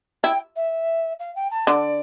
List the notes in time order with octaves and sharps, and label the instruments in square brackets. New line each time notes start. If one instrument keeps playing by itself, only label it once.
[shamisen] E4 [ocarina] G5
[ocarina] E5
F5
G5
A5
[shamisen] D3 [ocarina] D5